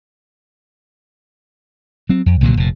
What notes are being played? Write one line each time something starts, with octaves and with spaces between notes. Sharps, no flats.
F#3 C4
F2
C2 A#2 D3 F#3
F1 A#2